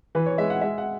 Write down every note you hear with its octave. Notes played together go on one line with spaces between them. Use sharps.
E3 B4
C#5
G#3 E5
F#5
G#3 E5
F#5